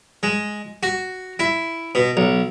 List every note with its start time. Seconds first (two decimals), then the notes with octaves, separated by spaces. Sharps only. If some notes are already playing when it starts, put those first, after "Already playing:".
0.23 G#3
0.83 F#4
1.39 E4
1.95 B2
2.17 B1